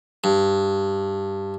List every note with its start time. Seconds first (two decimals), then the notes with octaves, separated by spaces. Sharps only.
0.24 G2